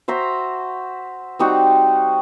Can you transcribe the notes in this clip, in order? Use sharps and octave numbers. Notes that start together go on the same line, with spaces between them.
F#4 C5 E5 A#5
G3 C4 D#4 F#4